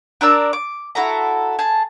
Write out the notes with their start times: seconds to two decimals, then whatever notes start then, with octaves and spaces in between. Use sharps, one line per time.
0.21 D4 A#4 D5 E6
0.53 D6
0.95 E4 F#4 A4 A#5
1.59 G#4 A5